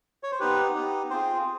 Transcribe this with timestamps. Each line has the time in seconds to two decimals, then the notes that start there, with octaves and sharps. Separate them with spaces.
0.23 C#5
0.31 C5
0.40 B3 D#4 G4 B4
0.75 B3 D#4 G4
1.10 C4 F4 G#4 C5